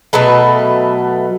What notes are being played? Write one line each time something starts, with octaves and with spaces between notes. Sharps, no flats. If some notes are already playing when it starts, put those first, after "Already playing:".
B2 F#3 A3 B4